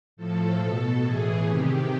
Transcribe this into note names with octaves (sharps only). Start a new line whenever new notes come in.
A2 F3 A4
B2
A2 E3 G#4
C3 D#3 G4